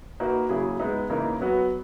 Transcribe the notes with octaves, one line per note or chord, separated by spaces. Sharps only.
A#3 D#4 F#4 B4
C#3 F#3 A#3 E4 G#4
G#3 B3 D#4
C#3 E3 A#3 D#4 A#4
F#3 B3 F#4